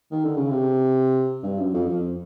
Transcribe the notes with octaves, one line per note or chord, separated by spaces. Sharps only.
D#3
D3
C#3
C3
G2
F#2
F2
F2